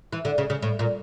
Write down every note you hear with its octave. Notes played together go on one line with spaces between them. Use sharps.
E3
D3
C#3
C#3
A2
A#2